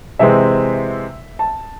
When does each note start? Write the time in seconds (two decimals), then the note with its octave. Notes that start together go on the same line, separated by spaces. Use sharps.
0.19 C3 E3 G#3 C4 E5
1.39 A5